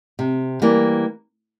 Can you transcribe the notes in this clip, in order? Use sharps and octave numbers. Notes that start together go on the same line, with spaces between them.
C3
E3 G3 A#3